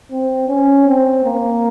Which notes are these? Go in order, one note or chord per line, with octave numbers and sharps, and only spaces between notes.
C4
C#4
C4
A#3